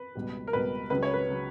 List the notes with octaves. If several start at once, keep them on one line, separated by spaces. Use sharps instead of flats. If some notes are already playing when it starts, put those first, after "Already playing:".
Already playing: B4
C#2 B2 G3
A#4
C#2 B2 G3 B4
C#2 C#3 F#3 B4
C#5
B4
C#3 F#3